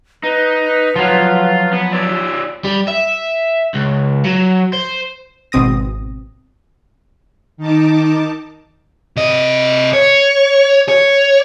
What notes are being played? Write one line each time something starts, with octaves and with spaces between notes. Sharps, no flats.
D#4 B4
F3 F#3 F4
B3
F4 C#5 D5 E6
G3
E5
C#2
F#3
C5
G#1 B2 C4 D#6 A#6
D#3 D#4 A5 D6
C3 D#5
C#5
C#5